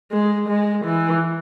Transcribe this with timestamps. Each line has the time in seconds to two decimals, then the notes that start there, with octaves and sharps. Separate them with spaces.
0.12 G#3
0.49 G#3
0.85 E3